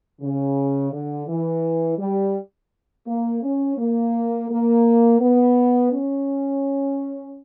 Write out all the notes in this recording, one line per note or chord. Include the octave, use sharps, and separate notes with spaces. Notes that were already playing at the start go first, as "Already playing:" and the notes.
C#3
D3
E3
G3
A#3
C#4
A#3
A#3
B3
C#4